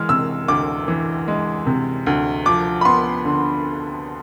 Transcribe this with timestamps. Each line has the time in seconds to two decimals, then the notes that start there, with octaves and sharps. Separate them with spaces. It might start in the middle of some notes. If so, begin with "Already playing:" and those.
Already playing: E3 G#3 F6
0.09 C3 E6
0.48 D2 D6
0.88 E3
1.28 G#3
1.67 C3
2.07 D2
2.46 F3 D6
2.81 B5
2.85 B3 C6
3.25 D3